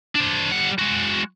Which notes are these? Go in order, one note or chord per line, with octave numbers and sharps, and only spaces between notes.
D4 C5
G3 F#5
G#3 F#4